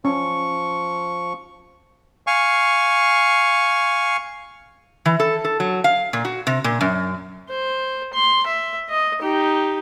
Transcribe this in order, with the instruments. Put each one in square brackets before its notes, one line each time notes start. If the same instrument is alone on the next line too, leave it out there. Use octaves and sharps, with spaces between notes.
[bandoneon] F3 C#6 [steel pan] C#4
[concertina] F5 G#5 C#6
[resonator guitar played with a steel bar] E3
A4
A4
F#3
F5
A#2
F#4
C3
A#2
F#2
[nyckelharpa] C5
C6
E5
D#5
D#4 G4